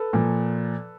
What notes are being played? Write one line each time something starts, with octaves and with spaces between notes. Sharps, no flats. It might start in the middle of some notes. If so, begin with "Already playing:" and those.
Already playing: A4 B4
A#2 F3